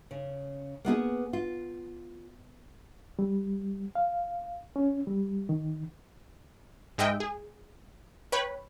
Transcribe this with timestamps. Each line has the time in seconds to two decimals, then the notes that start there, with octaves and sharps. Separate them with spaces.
0.11 C#3
0.85 A#3 B3 E4 G#4
1.33 F4
3.19 G3
3.95 F5
4.76 C#4
5.07 G3
5.49 D#3
6.98 G#2 G#3 D#5 E5 G5
7.20 G#4
8.32 B4 C#5 G5 B5